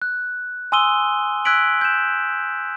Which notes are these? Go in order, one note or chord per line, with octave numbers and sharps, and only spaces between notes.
F#6
G#5 C6 D#6 E6 D#7 G7
E6 F#6 G#6 B6 D7 F#7
G6 E7